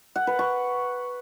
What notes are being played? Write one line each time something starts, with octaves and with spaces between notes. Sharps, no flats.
F#5
B4
C#6